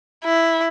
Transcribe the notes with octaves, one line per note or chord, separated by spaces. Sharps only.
E4